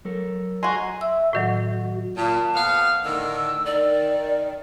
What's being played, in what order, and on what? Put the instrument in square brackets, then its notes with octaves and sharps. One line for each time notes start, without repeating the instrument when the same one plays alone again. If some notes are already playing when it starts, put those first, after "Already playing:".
[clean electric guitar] F#3 A4 A#4
[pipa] G#3 F#4 [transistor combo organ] G#5 A#5 C6
[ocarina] E5 [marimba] E6
[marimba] A2 D#3 F#3 [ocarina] F#4
[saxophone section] A#2 [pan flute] A5
[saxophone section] F2 B3 F5
[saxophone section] A2 D3 D#3 [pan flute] E6
[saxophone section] D#3 [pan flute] D5